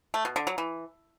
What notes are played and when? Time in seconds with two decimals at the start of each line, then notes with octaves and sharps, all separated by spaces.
0.14 A3
0.25 B2
0.36 D3
0.47 F#3
0.58 E3